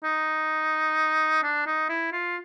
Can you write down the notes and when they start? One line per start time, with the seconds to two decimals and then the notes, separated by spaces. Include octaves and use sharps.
0.04 D#4
1.43 D4
1.66 D#4
1.89 E4
2.12 F4